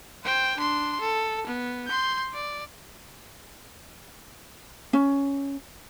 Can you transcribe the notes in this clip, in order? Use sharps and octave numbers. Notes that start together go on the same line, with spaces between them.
C5 G5
D4 C6
A4
B3
C6 G6
D5
C#4